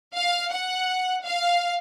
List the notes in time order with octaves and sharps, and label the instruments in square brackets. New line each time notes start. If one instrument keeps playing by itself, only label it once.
[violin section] F5
F#5
F5